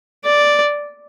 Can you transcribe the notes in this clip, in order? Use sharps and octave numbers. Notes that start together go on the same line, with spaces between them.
D5